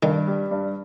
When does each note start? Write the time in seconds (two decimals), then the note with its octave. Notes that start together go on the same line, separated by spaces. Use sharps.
0.03 G2 D#3
0.27 G3
0.51 G2